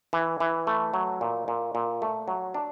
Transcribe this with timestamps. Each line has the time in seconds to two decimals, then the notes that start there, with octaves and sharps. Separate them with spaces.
0.13 E3
0.40 E3
0.67 A3
0.94 F#3
1.21 A#2
1.48 A#2
1.75 A#2
2.02 A3
2.28 F#3
2.54 D4